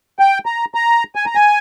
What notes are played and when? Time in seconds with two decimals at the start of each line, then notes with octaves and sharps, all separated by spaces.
0.19 G5
0.46 A#5
0.74 A#5
1.15 G#5
1.26 A#5
1.35 G#5